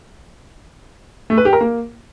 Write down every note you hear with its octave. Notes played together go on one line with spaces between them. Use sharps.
A3
B4
G4
A#4
A#3